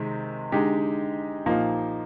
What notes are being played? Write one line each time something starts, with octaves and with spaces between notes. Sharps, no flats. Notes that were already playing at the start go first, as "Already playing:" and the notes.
Already playing: C3 D#3 G#3 C4
D3 G#3 D#4 G4
A#2 F3 A#3 D#4